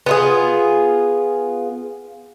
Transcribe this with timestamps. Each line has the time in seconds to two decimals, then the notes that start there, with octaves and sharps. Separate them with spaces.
0.06 B3 F4 G#4